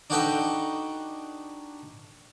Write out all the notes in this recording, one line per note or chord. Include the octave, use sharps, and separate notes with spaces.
D4 D#4 F#4 G4 A4 B4